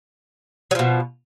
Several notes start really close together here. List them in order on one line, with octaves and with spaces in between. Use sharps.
F#3 F3 B2